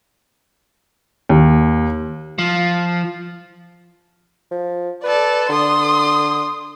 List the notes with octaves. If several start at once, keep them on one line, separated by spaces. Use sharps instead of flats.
D#2
F3
F3
A4 B4 D5
D3 C6 D#6